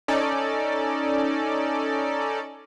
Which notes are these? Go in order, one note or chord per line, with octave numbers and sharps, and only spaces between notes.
C#4 D#4 A4 D5